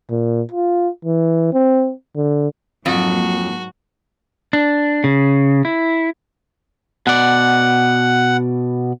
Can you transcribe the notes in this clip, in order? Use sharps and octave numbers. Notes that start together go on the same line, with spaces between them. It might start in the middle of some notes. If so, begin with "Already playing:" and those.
A#2
F4
E3
C4
D3
F2 G#2 F#3 A#3 F#4
D4
C#3
E4
B2 D5 F#5